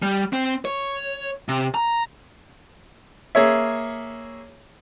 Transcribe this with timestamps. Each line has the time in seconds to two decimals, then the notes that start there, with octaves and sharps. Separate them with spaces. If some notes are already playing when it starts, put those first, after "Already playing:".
0.02 G3
0.33 C4
0.65 C#5
1.49 C3
1.75 A#5
3.35 A#3 G#4 C#5 E5